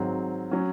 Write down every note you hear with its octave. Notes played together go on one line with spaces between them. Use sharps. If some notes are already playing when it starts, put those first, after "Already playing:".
Already playing: G#1 G#2 F#3 C4
F#3 C#4